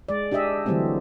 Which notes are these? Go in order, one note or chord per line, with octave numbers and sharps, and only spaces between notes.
G#3 D5
D4 G4 G#4 D#5 E5
D3 E3 F#3 G3 A3 C4